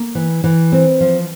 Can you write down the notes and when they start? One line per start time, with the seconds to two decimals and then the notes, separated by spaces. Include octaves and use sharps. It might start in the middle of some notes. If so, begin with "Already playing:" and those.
Already playing: A#3
0.15 E3
0.44 E3
0.72 C4
1.00 F3